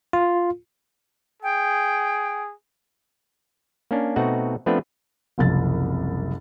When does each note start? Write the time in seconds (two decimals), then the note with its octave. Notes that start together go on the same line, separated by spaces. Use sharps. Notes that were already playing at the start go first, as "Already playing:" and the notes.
0.13 F4
1.42 G#4 G5
3.91 A#3 C#4 D4
4.16 B2 A3 C4 D#4 F#4 F#5
4.66 F3 A3 B3 C4 D4 B4
5.38 F#1 C2 F3 A6